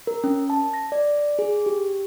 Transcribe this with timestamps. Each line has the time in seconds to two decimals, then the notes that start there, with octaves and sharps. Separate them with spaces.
0.07 A#4
0.24 C#4
0.50 A5
0.74 A#6
0.92 D5
1.39 G#4
1.66 G4